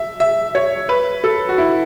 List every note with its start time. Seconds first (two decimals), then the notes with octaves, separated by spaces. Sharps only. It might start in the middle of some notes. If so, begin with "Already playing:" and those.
Already playing: E5
0.20 E5
0.55 C#5
0.89 B4
1.24 A4
1.49 F#4
1.58 E4